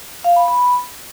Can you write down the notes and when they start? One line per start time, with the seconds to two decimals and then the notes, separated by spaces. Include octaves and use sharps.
0.24 F5
0.36 B5
0.48 B5